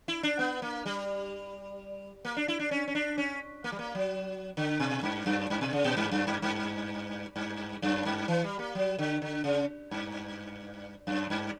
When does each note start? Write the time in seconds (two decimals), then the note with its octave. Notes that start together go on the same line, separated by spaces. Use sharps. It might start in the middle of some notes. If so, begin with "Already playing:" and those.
0.08 E4
0.23 D4
0.39 B3
0.62 A#3
0.86 G3
2.25 A#3
2.37 D4
2.48 E4
2.59 D4
2.71 C#4
2.88 C#4
2.95 D4
3.18 C#4
3.64 A#3
3.72 G3
3.79 A#3
3.95 F#3
4.57 D3
4.80 B2
5.03 G2
5.26 F#2
5.50 G2
5.61 B2
5.73 C#3
5.84 A#2
5.97 G2
6.11 F#2
6.27 G2
6.42 G2
7.36 G2
7.82 F#2
8.05 G2
8.28 E3
8.44 G3
8.59 A#3
8.75 F#3
8.99 D3
9.22 D3
9.44 C#3
9.91 G2
11.07 F#2
11.30 G2